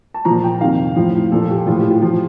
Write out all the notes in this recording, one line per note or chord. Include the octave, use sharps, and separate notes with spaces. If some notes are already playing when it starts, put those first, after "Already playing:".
A5
A#2 F3 A#5
G5
F2 C3 D#3 F5
A2 F3
A#2 F3 A4
A4
G4
A2 F3 F4
G4
F4
F3 F4